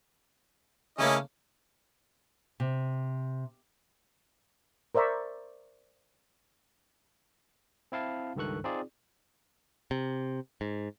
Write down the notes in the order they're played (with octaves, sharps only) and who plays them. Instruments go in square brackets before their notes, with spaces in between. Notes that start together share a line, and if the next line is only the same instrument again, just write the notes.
[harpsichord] C#3 A3 A#3 [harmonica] C#4 E4 D#5
[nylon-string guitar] C3
[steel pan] A#4 C5 D5 E5 A#5 C#6
[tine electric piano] C4 E4 F5 A5
C#2 G2 D#3 A4 C#6 F#6
C4 D#4 F4 G#4 D5
[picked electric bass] C3
G#2